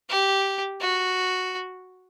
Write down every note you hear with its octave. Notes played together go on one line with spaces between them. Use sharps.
G4
F#4